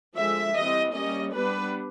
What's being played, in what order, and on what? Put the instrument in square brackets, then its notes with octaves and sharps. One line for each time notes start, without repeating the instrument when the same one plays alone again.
[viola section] D3 F3 G#3 E5
E3 G3 C4 D#5
G3 A#3 C#4 D#5
G3 B3 D4 B4